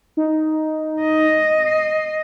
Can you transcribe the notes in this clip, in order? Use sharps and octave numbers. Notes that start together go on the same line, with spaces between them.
D#4
D#5
C7